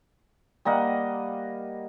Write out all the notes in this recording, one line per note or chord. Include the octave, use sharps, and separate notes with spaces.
G3 A#3 D#5 F#5